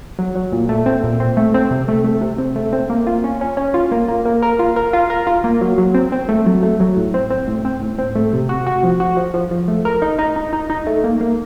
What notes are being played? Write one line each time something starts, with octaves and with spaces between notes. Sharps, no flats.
F#3
F#3
A#2
A3
C4
A#2
C4
A3
C4
C3
A3
A3
C3
C4
A3
C4
A#3
F4
C#4
C#4
C#4
F4
A#3
A#3
A#3
A#4
F4
A#4
F4
A#4
F4
A#3
F#3
F#3
C4
C4
A3
F#3
A3
F#3
A2
C4
C4
A2
C4
A2
C4
A3
C3
F#4
F#4
F3
F#4
F3
F3
F3
A3
A#4
D#4
D#4
D#4
D#4
D#4
A3
A#3
A#3